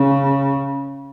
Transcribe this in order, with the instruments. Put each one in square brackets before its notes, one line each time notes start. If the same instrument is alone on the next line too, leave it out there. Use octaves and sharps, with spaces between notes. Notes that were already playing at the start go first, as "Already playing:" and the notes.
Already playing: [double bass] C#3